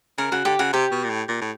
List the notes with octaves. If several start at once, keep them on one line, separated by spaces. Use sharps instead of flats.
C#3 A#4
C#3 F#4
D3 G4
C#3 F#4
C3 G4
B2
A#2
A2
A#2
A2